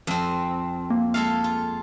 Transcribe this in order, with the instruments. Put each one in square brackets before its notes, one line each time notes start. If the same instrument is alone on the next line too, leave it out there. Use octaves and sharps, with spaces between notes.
[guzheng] F2 C4
[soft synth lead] A#3
[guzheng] G#3 A4 F5
F4